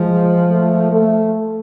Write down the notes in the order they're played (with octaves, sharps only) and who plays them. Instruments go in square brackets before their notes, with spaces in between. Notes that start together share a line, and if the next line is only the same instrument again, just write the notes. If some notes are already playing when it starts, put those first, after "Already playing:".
Already playing: [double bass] F3 [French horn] G#3
[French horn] A3
A3